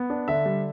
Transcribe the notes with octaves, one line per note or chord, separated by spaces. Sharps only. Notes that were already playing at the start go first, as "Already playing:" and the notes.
Already playing: B3
D4
D3 E5
G3